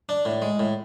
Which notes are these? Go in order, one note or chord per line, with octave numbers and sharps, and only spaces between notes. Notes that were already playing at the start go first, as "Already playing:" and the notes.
D4
A2
G#3
A2